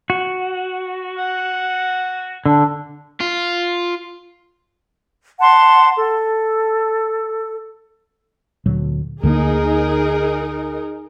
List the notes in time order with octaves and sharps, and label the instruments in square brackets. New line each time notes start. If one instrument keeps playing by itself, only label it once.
[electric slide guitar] F#4
[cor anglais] F#5
[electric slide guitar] D3 [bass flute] D4
[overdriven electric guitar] F4
[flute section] F#5 A5 C6
A4
[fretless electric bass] D2 A#2 F#3
[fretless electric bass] D2 D3 A#3 [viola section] D#4 G#4 A#4